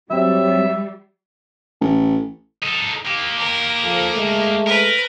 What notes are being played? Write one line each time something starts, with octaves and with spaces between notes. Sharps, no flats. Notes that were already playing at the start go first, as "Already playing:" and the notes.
G2 F#3 G3 C4 G4 C#5 E5
A1
D#4 A4
A#3 G4
A#4
F3 A4
G#3 A3
A#4 B4